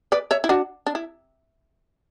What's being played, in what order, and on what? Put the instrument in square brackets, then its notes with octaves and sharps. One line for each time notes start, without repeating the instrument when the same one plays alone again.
[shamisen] B4 D5
C#5 E5
E4
D4 F#4
D4
E4